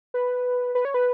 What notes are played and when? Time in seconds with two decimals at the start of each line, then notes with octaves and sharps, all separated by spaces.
0.14 B4
0.75 B4
0.85 C#5
0.94 B4